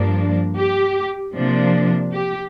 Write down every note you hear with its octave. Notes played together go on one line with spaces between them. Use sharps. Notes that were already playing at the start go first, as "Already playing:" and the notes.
Already playing: G2 F3 A#3 D4
G4
C3 F3 A#3 D4
G4